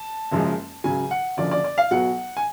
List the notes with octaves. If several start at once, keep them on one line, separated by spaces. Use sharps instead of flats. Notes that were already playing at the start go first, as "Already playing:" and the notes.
Already playing: A5
F#1 F#2 F3 G#3
C#2 C#3 F#3 G#5
F#5
F#1 F#2 D3 F3 D5
D5
D5
F5
B1 B2 F#3 F#5
G#5